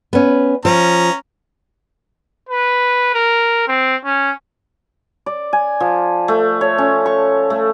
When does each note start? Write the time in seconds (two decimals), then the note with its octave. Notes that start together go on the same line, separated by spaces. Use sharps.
0.13 B3 C#4
0.65 F3 C#4 A#5
2.49 B4
3.14 A#4
3.68 C4
4.05 C#4
5.26 D5
5.53 G#5
5.80 F3
6.28 A3
6.61 C#5
6.78 C#4
7.06 C#6
7.50 A3